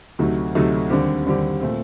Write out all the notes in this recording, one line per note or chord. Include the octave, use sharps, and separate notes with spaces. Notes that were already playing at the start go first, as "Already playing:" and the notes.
D2 C3 F#3 A3 D#4
D2 C3 F#3 A3 D#4
D#2 D3 G3 C4 G4
D#2 D3 G3 C4 G4
A#2 A3 C4